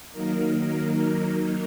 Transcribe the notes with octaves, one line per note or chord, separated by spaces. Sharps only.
D#3 F#3 A#3 D#4 A#4